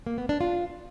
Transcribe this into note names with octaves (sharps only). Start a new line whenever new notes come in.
A#3
B3
D4
F4